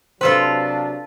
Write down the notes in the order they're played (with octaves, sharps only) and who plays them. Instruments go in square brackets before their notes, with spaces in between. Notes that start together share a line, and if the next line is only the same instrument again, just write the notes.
[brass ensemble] C3 F#3 D4 [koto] F4 A4 B4 [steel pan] C5